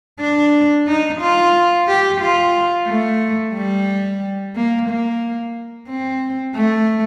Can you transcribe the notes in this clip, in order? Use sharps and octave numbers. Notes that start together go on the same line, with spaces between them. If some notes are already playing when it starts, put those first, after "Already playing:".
D4
D#4
F4
G4
F4
A3
G3
A#3
A#3
C4
A3